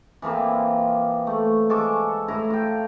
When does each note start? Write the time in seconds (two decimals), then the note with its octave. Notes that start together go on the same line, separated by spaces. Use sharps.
0.22 E3 F3 A#3 C4
1.27 A3
1.69 G#3 A4 C#6 D6
2.28 A2 E4 A#5
2.50 F4 G5